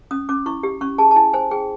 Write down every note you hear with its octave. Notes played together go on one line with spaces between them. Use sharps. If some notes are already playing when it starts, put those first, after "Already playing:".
C#4 D#6
C#4 D6
E4 C#6
G4
C#4 C#6
G#4 A5
A5
E4 G#5
C5 G#5
G#4 G5